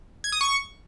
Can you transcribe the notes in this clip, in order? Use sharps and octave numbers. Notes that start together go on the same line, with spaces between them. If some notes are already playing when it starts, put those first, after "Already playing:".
G#6
D#6
C#6